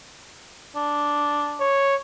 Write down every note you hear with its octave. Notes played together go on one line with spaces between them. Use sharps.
D4
C#5